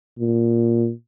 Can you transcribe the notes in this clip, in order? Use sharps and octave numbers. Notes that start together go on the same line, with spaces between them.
A#2